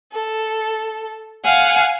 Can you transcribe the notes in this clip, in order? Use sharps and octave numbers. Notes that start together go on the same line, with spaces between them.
A4
F5 F#5 G#5